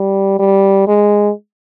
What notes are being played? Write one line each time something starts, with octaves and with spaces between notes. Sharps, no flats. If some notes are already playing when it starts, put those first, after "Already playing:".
Already playing: G3
G3
G#3